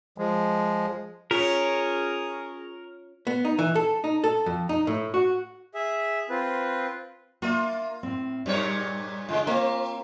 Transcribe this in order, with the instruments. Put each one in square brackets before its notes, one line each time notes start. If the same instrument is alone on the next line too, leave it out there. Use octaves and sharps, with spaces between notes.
[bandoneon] F3 G#3
[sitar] C#4 [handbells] F4 [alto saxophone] G#4 [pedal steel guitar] A#4 C#5
[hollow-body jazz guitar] B3
D#4
E3
A4
D#4
A4
F2
D#4
A2
F#4
[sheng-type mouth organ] G#4 E5
C4 F4 B4
[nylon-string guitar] A#3 E5 [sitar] F4
[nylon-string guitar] A2 C4
[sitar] G2 A#2 C#5 [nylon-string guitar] G3
[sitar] C#3 G#3 [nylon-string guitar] F4
[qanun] A#3 [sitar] C4